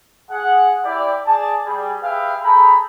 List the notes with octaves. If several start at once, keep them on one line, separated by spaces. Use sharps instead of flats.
G#4 F#5
E4 G4 D5
G#4 D5 A5
G3 G#4
G4 G#4 B4 E5 F5 G5
G#4 A4 G5 A#5 B5